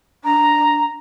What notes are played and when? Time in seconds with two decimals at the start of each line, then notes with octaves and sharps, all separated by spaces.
0.24 D4 A#5